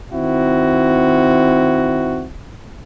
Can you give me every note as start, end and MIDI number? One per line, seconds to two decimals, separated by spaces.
0.12 2.27 51
0.12 2.27 60
0.12 2.27 64
0.12 2.27 66